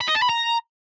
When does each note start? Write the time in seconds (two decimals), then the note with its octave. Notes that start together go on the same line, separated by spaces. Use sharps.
0.01 B5
0.08 D#5
0.15 A5
0.22 B5
0.29 A#5